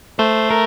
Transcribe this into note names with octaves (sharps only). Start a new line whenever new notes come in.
A3 C5
A#4